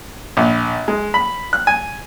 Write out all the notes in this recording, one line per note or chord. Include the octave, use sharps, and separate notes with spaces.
A#1
G#3
B5
F#6
G#5